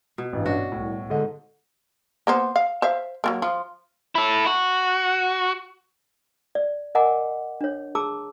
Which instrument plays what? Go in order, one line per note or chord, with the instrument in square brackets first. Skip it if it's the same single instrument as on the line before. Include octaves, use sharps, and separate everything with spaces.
[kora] B2
[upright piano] A1 E3 [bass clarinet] G2
[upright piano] C#4 D4 D#5 [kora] F#4
[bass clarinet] C2 [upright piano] A2
[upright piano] G#2 D#5 [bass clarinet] D3
[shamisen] A#3 B3 C5
F5
C5 E5 F5
F#3 G3 A#3
F3 F4
[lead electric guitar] E4 A4
F#4
[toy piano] D5
A#4 D#5 F#5 G#5 A#5 D6
D4 C#5
G#4 A5 A#5 D6 E6